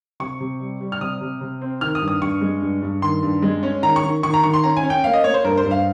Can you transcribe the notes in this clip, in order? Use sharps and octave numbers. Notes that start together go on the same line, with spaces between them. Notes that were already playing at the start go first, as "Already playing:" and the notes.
C3 C#6
C3
G3
G3
F6
C3 D#6
C3
C3
C4
D#3 F6
D#6
G2
D#6
G2 C#6
G#3
G2
G2
D#3 C6
G2
G#3
C#4
D#3 A#5
C#6
D#3
D#3 C#6
A#5
D#3 C#6
C6
C#4 A#5
G#5
C#4
G5
A#3 F5
D#5
A#3 C#5
C5
G2 A#4
C5
G2
F5